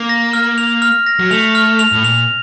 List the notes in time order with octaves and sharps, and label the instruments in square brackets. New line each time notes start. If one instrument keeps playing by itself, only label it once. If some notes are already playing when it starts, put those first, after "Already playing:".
Already playing: [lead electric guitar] A#3
[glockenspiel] A#6
F6
F7
F6
A#6
[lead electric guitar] F#3
[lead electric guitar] A3 [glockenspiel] F7
[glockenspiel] F6
F7
[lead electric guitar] A2
[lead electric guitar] A#2 [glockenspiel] F7